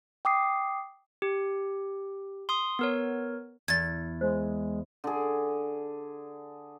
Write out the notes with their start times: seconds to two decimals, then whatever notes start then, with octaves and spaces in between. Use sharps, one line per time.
0.25 G5 D6 D#6 C7
1.22 G4
2.49 C6 D#6
2.79 B3 A#4 C#5
3.68 E2 G#6 A6
4.21 G#3 C5
5.04 D3 G#4